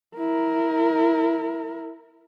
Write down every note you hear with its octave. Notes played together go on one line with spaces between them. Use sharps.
E4 A#4